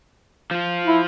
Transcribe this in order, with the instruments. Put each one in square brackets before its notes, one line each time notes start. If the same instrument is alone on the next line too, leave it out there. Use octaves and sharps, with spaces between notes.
[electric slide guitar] F3 F4
[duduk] E4